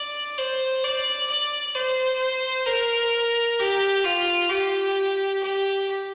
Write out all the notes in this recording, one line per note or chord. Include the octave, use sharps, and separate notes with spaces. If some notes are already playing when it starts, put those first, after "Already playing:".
Already playing: D5
C5
D5
D5
C5
A#4
G4
F4
G4
G4